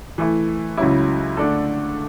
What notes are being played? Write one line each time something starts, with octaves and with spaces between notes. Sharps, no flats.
E3 A3 E4
C#2 C#3 F#3 C#4 E4
D3 A3 D4 A4